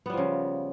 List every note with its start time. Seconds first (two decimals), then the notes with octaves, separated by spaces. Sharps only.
0.06 B3
0.10 G3
0.13 F3
0.17 C#3